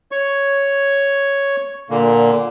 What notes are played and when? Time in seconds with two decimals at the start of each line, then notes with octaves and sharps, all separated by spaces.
0.12 C#5 C#6
1.90 A#2 D3 A#3